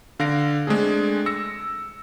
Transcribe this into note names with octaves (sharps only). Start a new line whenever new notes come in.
D3 F5 A#6 D7
G#3 A3 C4 D4 G#4
E6 A#6 C#7